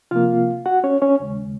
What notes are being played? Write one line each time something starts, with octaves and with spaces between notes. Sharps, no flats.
C3 F3 A#3 F4 F5
F#4 F#5
C#4 C#5
C#4 C#5
D#2 C#3 G#3